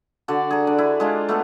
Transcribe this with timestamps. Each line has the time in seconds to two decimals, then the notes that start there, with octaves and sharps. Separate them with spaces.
0.28 D3 F#4 D5 A5
0.51 G#4 A#5
0.67 D4
0.78 E4
1.00 G#3 D4 F4
1.29 A3 B3 A4